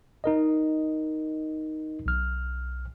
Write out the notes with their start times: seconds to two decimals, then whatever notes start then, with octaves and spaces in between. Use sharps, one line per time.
0.24 D#4 A#4 D#5
2.06 B1 F6